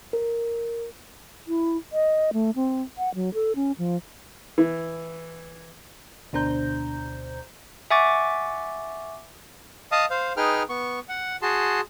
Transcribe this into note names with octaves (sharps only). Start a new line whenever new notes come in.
A#4
E4
D#5
A3
C4
F#5
F#3
A4
C#4
F3
E3
D2 B2 D4 C5 A#5 G6
E5 F#5 G#5 C#6 D6 A6
D#5 F5 A5 D#6
C5 F5
D#4 G#4 B4 G5 F6
B3 C#6
F#5
F#4 G#4 A5 C6